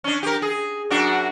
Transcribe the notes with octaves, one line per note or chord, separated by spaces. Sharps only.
C#4 D4
G4 A#4
G#4
F#2 D4 F#4